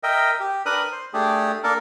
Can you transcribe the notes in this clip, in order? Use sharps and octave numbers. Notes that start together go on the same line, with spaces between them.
A#4 D#5 E5 G5
G4
D4 A#4 B4 D#6 F#6
C5
A3 D4 G4 G#4
A#3 D4 A4 A#4